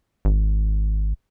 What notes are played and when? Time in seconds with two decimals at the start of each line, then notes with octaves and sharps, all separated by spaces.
0.25 G#1